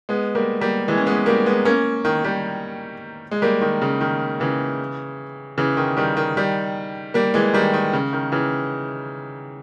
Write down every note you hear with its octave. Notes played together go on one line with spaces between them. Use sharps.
G#3 B3
G3 A#3
G3 A#3
E3 G#3
C#4
G#3 B3
G3 A#3
G#3 B3
A#3 C#4
D#3
D#3 G3
G#3
G3 A#3
D#3
C#3
D#3
C#3 E3
C#3 E3
D#3
D#3 G3
D#3
D#3 G3
G3 A#3
E3 G#3
D#3 G3
D#3
C#3
D#3
C#3 E3